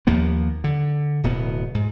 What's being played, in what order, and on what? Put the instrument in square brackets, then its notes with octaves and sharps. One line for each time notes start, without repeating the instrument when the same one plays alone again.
[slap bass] D#2 F3 A#3 B3
D3
D1 B2 B3
G#2